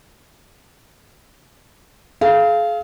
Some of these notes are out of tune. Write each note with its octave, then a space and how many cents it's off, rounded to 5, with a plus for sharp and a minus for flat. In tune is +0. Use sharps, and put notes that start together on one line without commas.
G#4 +40 F5 -15